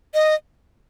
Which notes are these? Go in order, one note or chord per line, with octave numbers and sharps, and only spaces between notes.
D#5